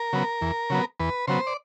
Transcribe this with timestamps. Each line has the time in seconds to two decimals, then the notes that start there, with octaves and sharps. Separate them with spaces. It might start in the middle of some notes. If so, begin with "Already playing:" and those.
Already playing: A#4
0.13 C#3 F#3 B3
0.42 E2
0.70 C#3 F#3 B3
1.00 E2 B4
1.27 C#3 F#3 B3 C5
1.47 D5